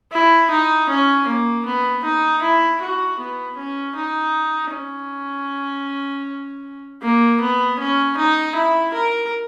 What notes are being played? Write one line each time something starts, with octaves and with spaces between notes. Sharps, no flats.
E4
D#4
C#4
A#3
B3
D#4
E4
F#4
B3
C#4
D#4
C#4
A#3
B3
C#4
D#4
E4
A#4